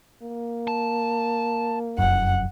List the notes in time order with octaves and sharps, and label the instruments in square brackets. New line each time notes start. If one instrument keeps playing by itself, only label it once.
[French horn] A#3
[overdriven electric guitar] A5
[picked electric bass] F1 F#2 [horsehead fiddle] F#5